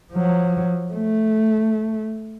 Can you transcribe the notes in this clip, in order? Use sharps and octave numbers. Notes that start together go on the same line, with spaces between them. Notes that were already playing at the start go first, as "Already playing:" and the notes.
F3 F#3
A3